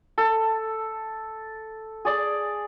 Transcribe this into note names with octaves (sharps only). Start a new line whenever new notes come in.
A4
G#4 D5